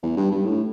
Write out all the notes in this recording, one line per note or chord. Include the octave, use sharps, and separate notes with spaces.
E2
G2
G2
A2